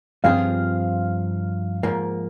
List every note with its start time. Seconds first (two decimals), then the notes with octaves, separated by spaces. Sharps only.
0.24 G2 F3 C4 F4 G#4 F5
1.83 G#2 F3 A#3